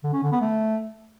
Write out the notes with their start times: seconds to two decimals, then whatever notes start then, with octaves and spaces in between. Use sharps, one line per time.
0.04 D3
0.13 C#4
0.23 D3
0.32 B3
0.41 A3